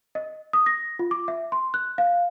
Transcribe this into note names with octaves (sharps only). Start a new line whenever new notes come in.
D#5
D#6
A#6
F4
D6
E5
C6
F#6
F5